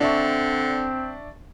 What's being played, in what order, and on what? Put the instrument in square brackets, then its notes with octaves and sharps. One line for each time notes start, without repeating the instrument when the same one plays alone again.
[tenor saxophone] D3 [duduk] C4 [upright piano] D4 E5 C#6